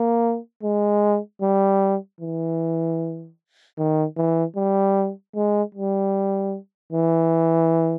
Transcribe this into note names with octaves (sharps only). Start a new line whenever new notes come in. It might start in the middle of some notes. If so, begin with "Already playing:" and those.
Already playing: A#3
G#3
G3
E3
D#3
E3
G3
G#3
G3
E3